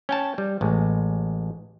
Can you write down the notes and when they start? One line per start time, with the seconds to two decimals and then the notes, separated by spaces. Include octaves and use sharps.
0.09 C#4 G5 A5
0.38 G3
0.61 A1 G#3